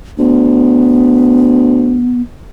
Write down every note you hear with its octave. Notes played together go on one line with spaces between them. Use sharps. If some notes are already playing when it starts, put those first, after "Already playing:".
D2 B3